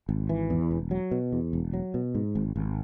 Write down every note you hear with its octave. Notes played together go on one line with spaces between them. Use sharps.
G#1
E3
E2
E1
F#3
B2
E2
E1
F#3
B2
G#2
G#1
G#1